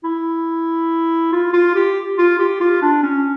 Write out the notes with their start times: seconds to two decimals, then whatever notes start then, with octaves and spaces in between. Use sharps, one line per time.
0.04 E4
1.33 F4
1.53 F4
1.76 G4
2.18 F4
2.39 G4
2.61 F4
2.82 D4
3.03 C#4